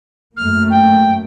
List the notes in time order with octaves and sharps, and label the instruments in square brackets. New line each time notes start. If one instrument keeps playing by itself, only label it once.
[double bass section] F#2 A3 A#3 [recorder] F6
[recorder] G5